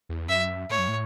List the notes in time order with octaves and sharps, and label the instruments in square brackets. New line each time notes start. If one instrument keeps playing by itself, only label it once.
[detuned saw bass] E2
[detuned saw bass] F#2 [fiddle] E5
[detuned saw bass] A2 [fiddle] C#5
[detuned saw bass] F#2
A2